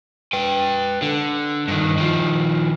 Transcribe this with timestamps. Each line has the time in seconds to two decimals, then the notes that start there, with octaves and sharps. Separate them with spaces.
0.33 B4 G5
1.02 D3
1.68 G2 D#3
1.97 D#3 F3